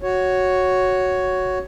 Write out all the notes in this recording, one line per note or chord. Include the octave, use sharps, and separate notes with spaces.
F#4 C#5